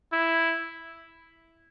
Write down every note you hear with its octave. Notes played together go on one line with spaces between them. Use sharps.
E4